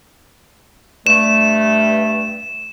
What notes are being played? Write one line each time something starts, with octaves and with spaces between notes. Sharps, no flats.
G2 A3 E7